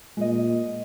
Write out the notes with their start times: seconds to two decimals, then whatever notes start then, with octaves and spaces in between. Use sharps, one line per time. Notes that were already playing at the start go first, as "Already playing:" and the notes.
0.17 A#2 G#3 D#5